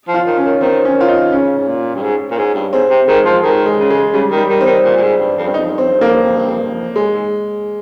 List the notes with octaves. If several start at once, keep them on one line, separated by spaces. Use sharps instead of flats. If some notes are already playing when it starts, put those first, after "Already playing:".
F3
F4
D#3
C#4
D#3
D#3 C4
C#4
D#3 F4
D#4
C#3 C#4
G#2
A#2
G2
G#2
A#2
G#2
G2
G#2 C4
C3
D#3 G#3
F3
D#3 G#3
G#3
C#3
G#3
C#3 G3
D#3
G3
D#3
C4
D#3
A#2
A#2
G#2
G2
F2
G2
D#4
F2
G2
C4
F2
G2
F2 A#3
G2
F2
G2
F2
G2
F2
G#3
G#2